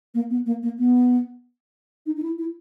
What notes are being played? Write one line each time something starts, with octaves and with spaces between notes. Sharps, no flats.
A#3
B3
A#3
A#3
B3
D#4
D#4
E4
E4